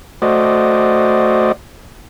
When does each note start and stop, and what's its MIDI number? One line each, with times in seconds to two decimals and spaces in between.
0.22 1.52 57
0.22 1.52 66
0.22 1.52 72
0.22 1.52 74
0.22 1.52 75